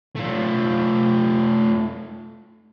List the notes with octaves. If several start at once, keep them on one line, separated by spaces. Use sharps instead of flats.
A3 F4